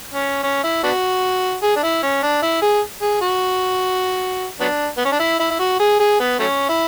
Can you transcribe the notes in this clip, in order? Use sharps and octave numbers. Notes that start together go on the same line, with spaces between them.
C#4
C#4
E4
B3 D4 F#4
G#4
D4
E4
C#4
D4
E4
G#4
G#4
F#4
F#3 B3 D4
B3
C#4
D4
E4
E4
E4
F#4
G#4
G#4
B3
F#3 A3 C#4
E4